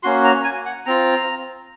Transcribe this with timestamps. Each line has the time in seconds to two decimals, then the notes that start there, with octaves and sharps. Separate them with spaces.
0.03 A#3 C#4 F#4 C6
0.24 A#5
0.44 G#5
0.66 F#5
0.86 C4 F4 A#5